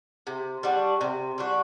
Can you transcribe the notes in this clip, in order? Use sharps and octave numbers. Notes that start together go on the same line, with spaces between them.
C3
G3 D4 F#4
C3
G3 D4 F#4